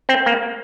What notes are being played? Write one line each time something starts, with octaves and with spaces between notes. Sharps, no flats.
C4
A#3